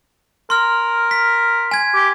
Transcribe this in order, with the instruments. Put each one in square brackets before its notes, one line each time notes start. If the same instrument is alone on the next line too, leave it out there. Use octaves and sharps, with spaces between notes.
[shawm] A#4 [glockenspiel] C6 F6
[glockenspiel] B6
G#5 G#6
[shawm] G4